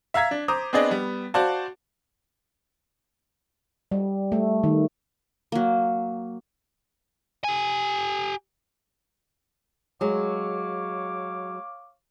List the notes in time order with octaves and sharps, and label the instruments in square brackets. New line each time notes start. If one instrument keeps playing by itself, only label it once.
[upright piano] E5 F5 A#5 G#6 B6
D4
C5 A#5 D6 D#6
B3 C4 D4 G#4 D5 D#5
G3 B3
F#4 C5 D5 F5 A5
[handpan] G3
A3
D#3
[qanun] F#3 A#3
[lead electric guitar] G4 G#5
[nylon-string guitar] F#3 G#3 [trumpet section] C#5 F5 D6